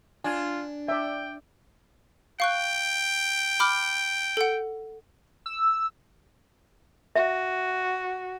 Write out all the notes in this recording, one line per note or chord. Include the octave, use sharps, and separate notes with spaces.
D4 F4 G#5
D5 E5 G5
F5 G5 C#6 F#6
B5 D6 F6
A4 F#5
E6
F#4 E5